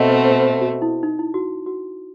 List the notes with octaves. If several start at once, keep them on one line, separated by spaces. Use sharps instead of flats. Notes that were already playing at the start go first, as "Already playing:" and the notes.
Already playing: B2 A3 C4 D#5 F#5
C5 E5
C5 E5
C5
F#4
E4
D#4
E4
F#4
F#4